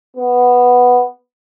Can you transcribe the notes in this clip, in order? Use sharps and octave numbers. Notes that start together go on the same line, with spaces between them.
B3